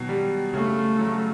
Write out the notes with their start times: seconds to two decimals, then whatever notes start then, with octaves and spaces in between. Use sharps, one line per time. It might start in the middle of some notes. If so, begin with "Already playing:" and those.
Already playing: B2 D#3 F#3
0.09 G3
0.54 C#3 A3
0.99 F#3